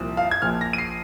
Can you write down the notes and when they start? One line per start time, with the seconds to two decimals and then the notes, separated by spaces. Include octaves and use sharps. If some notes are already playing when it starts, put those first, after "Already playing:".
Already playing: C2 A#2 F3
0.17 F5
0.31 G#6
0.42 A#1 A#2 F3 F6
0.61 A#6
0.73 D#7
0.78 C7